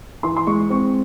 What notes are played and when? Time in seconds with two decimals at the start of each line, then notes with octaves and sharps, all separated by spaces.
0.23 E3 C6
0.36 C6
0.47 G#3 C#6
0.70 C4 C#6